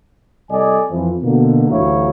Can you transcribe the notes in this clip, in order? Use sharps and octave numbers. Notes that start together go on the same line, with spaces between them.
C2 A4 D5 D#5 G#5
F2 E3 F3
B2 D3 A#3
A1 D2 F#3 E4 C#5 F5